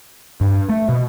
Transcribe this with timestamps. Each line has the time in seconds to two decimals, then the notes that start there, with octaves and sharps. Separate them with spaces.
0.41 G2
0.69 A3
0.89 B2